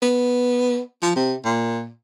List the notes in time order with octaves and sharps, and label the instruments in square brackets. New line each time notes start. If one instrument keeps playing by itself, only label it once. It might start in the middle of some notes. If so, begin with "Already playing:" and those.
[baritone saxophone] B3
F3
C3
A#2